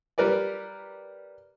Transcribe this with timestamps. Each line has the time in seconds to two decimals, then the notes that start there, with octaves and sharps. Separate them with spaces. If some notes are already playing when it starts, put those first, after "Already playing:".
0.18 G3 A#4 B4 D5